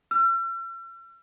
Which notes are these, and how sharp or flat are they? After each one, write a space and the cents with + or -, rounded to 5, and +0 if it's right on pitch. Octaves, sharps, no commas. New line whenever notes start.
E6 +45